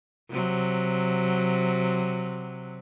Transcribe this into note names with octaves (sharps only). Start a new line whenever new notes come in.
C3 F#3